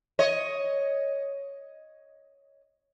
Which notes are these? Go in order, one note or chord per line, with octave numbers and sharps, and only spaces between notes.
C#5 D#5